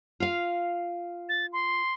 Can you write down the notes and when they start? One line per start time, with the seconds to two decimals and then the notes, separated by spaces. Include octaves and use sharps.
0.20 F4 F5
1.29 A6
1.53 C6